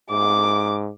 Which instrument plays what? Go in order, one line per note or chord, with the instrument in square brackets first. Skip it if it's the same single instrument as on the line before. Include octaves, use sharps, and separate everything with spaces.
[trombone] G#2 [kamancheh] D6